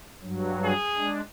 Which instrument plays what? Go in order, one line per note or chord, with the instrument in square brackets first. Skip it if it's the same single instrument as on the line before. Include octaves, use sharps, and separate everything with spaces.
[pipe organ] G2 F#3
[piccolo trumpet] G#4
[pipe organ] G#3 D4